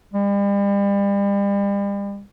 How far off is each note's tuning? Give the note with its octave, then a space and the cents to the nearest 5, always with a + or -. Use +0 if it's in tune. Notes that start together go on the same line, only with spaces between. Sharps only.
G3 +40